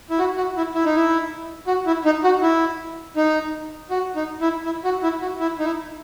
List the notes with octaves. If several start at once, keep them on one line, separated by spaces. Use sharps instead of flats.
E4
F#4
F#4
E4
E4
D#4
E4
F#4
E4
D#4
F#4
E4
D#4
F#4
D#4
E4
E4
F#4
E4
F#4
E4
D#4
E4